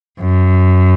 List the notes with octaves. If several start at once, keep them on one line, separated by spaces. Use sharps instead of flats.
F#2